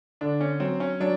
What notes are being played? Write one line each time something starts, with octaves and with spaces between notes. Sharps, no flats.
D3 D4
C#4
F#3 C4
C#4
F#3 D4